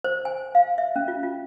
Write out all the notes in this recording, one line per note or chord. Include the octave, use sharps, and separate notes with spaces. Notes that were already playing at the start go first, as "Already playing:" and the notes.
C5
G#5
F5
E5
C#4
F4
F4